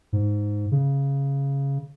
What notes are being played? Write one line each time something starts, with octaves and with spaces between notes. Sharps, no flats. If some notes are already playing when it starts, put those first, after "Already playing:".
G#2
C#3